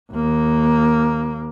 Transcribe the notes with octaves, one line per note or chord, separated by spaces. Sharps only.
D#2 A#3